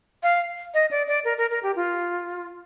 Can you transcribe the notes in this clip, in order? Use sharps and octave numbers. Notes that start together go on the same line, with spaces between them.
F5
D#5
D5
D5
A#4
A#4
A#4
G4
F4